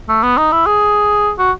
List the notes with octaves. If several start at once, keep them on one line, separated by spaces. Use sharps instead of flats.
A3
B3
D#4
E4
G#4
F#4